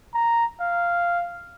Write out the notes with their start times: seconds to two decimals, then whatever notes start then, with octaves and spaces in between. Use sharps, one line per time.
0.14 A#5
0.61 F5